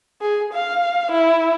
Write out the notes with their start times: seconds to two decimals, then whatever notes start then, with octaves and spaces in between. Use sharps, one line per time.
0.21 G#4
0.53 F5
1.12 E4